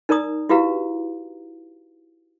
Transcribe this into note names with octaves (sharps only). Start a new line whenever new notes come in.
D#4 A#4 D5 A#5 D#6
E4 F#4 G4 B4 F5 A#5